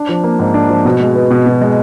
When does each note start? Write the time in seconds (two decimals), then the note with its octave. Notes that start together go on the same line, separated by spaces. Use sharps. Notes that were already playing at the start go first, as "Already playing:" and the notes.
Already playing: D4
0.09 F3
0.24 A#3
0.39 G#2
0.54 D4
0.69 F3
0.85 B2
1.00 G#3
1.16 B3
1.31 B2
1.46 B2
1.61 G#3